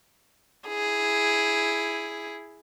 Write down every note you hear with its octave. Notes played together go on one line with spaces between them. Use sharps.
E4 G#4